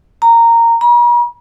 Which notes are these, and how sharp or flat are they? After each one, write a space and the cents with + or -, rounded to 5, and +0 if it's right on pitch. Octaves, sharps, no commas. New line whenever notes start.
A#5 -10
A#5 +45